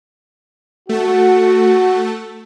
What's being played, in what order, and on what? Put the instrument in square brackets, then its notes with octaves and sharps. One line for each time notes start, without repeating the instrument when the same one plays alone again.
[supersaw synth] A3 A5 [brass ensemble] F#4